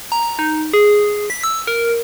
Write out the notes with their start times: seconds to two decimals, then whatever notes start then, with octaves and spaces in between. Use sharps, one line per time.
0.12 A#5
0.39 D#4
0.73 G#4
1.30 B6
1.44 E6
1.67 A#4